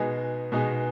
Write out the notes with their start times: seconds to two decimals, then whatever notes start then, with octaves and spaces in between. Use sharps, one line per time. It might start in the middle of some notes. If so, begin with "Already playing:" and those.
Already playing: B2 G#3 B3 D#4 G#4
0.52 B2 G#3 B3 D#4 G#4